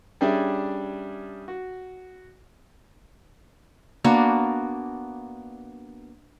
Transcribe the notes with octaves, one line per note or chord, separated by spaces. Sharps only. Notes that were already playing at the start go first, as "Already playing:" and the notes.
G3 C#4 D4 G#4 E5
F#4
A#3 B3 D4 F#4